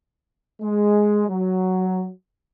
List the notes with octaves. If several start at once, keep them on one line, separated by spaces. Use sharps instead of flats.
G#3
F#3